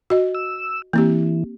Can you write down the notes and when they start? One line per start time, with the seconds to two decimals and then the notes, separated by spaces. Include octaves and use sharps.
0.10 F#4 D#5
0.35 E6
0.93 E3 A#3 C4 G4